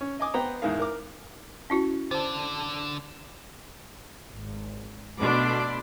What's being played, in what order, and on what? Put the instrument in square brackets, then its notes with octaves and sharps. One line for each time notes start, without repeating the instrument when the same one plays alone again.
[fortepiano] C#4
D#5 G#5 D6 D#6
B3 C5 G5 A#5
A1 E2 G#2 G#3 A#4 F5
A#4 D6
[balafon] C#4 E4 F#4
[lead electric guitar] D3 D4 [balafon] C5
[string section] G#1
B2 A3 D4 B5 C6 D6